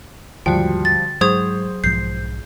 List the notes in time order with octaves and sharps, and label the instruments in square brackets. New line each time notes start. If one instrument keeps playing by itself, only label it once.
[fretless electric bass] D#2 G#2 [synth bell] D3 F#4 [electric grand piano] F3 G3 [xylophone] G5
[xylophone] A6
[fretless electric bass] G#2 [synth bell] F#3 [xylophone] G#4 D#6 G#6 [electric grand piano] C5
[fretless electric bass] B1 G#2 F3 [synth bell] G6 [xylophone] C7